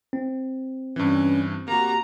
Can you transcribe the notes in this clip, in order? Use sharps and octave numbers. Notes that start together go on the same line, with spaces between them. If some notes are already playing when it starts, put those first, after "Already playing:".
C4
G2 E3 C#4
A#3 F#4 G4 A#5